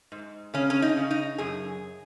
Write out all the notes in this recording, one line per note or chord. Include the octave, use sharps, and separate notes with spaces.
G#2
C#3 C#4
C#4
D#4
C#3
D#4
F#2 G#4